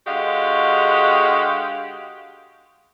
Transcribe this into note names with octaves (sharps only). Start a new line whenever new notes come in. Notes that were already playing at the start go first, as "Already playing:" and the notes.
D3 G#3 F#4 G4 F5